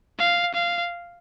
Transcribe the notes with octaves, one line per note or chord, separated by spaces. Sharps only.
F5
F5